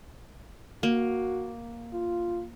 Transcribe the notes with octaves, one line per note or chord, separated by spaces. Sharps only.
A#3 F#4
F4